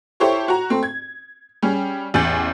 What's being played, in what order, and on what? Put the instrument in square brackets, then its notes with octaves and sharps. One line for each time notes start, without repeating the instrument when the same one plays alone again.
[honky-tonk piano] E4 G4 A4 C5 C#5 C#6
F#4 A#5
A3 C4
G#6
G3 C#4 G#4
A1 E2 G#5 G6 A6 F#7